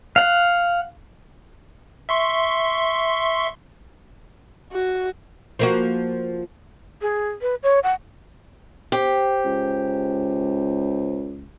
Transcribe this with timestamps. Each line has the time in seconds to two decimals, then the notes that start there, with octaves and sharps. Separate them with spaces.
0.16 F5 F#5
2.09 E5 C6 C#6
4.73 F#4
5.59 F3 A#3 F#4
7.02 G#4
7.41 B4
7.63 C#5
7.83 F#5
8.92 G4 C5
9.45 C#2